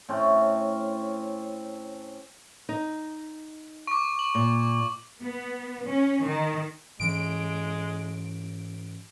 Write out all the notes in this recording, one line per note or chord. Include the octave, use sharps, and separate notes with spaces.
A2 C4 C#4
D#4
C#6 D6
F#7
A#2
B3
C#4
D#3
G#2 E3 G#3 C#4 D7